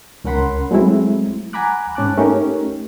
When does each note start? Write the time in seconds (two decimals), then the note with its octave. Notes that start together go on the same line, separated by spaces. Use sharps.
0.24 C#2 C#4 A#4 F#5 B5 C6
0.71 F#3 G#3 A3 C4 E4
1.53 F#5 G#5 A#5 B5 D6 F#6
1.95 G#2 C#4 A5 D6 F#6
2.17 A3 C#4 D#4 G4 A#4